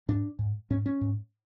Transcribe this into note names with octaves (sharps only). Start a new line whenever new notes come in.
G#2 D4
G#2
G#2 C#4
C#4
G#2